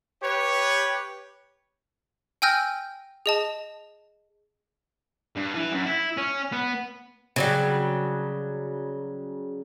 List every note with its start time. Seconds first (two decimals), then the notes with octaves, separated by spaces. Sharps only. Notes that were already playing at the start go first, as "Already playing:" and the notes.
0.22 G4 B4 C#5
2.42 G5 G#5 E6 F6 G6 A#6
3.26 G#4 D#5 A5
5.36 G2
5.54 E3
5.73 F#2
5.86 E4
6.17 C#4
6.53 B3
7.36 C#3 F#3 G3